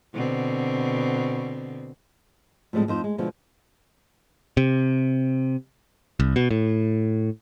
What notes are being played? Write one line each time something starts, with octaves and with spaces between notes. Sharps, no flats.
B2 D3 C4
A2 F3 G3 G#3 C4 A4
F2 D#4 C5
G#3
B2 D3 F3 G#3
C3
C2
B2
A2